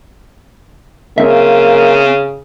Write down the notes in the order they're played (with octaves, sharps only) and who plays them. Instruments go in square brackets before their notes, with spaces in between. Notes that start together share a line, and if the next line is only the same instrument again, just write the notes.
[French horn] C#3 [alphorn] A#3 [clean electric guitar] C4 E5